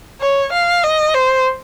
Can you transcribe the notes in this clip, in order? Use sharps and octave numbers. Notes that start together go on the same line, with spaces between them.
C#5
F5
D#5
C5